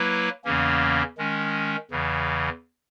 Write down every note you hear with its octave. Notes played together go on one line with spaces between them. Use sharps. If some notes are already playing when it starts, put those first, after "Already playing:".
Already playing: F#3 A#3 E4 B4
E2 C#3 E3 A#3 C#4
D#3 G#3 C#4
E2 C#3 E3